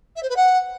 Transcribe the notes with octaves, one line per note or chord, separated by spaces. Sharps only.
E5
C5
B4
F#5